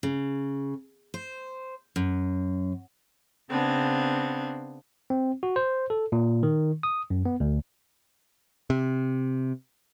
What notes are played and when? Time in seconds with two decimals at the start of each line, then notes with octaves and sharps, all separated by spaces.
0.03 C#3
1.14 C5
1.96 F#2
3.50 C#3 B3 C4 D4
5.10 C4
5.43 F#4
5.56 C5
5.90 A4
6.12 A#2
6.43 D#3
6.83 D#6
7.10 F#2
7.26 B3
7.40 D2
8.70 C3